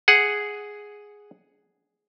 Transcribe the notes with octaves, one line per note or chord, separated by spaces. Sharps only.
G#4 F#5